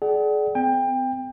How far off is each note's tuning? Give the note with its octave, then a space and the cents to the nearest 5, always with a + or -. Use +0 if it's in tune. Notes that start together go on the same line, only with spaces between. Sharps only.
G#4 +35 D5 +0 F#5 +40
C4 -40 G5 +25